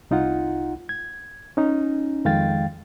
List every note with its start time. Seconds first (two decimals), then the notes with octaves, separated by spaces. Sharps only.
0.11 C2 D#4 F4 F#5
0.89 G#6
1.57 C#4 D#4
2.25 F2 D#3 G#3 F5 G5 A6